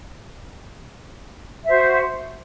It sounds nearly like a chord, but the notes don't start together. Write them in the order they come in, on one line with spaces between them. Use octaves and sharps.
E5 C5 F#4